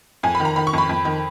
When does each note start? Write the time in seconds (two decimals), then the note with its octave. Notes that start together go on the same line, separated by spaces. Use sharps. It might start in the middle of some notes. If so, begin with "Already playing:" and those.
0.23 F2 G#5
0.35 B5
0.40 D#3
0.45 A#5
0.56 D#3 B5
0.67 C#6
0.73 F2 B5
0.89 F2
1.05 D#3